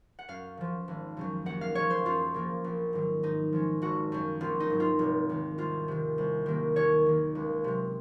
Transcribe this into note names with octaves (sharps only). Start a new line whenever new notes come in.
F#5
F#2 F5
C#3 F3
G#1
F#2 C#3 F#3
D#2 F#5
F5
C#3 F3 C#5
C5
F#2 F4
C#3 F3 A#3
A#1
G#2 D#3 F#3
G#2 D#4
F3 G#3 C#4
G#1 F#4
F#2 C#3
A#1 F4
D#4
G#2 F#3 C4
F4
F1
D#2 D#3
C2 F4
C3 D#3
C2
C3 D#3 F#3 A#3
D#2 C#5
D#3 A#3
C#2
C3 F#3